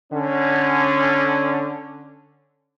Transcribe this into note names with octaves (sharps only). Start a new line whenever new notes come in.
D3 C#4